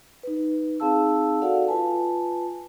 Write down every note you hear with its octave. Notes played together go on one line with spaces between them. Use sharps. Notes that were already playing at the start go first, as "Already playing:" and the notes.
D#4 B4
C4 D#4 G#4 F5 A5 E6
F#4 A4 D5 F5 F#5
F4 B4 G#5 A5